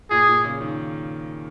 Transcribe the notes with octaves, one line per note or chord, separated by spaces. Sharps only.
A#2 G#4
A#2
C#3
D#3